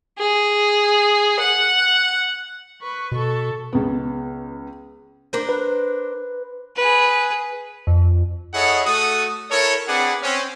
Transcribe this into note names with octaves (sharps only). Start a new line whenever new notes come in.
G#4
F#5
B4 C#6
B2 A4 C#6
C#2 B3
D4 A#4 C5
B4
G#4 B4
F2
E4 G#4 A4 C#5 D#5 F#5
A3 F#4 A4 F#5 D#6
E4 A4 A#4 C#5
C4 D4 G#4 B4 D5 F#5
C4 C#4